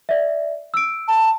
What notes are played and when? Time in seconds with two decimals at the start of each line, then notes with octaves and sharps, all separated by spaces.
0.09 D5 E5
0.74 E6 D7
1.08 A5